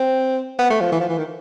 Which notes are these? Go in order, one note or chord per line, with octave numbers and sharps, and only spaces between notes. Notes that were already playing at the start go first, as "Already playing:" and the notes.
Already playing: C4
B3
A3
F3
E3
F3
E3
D#3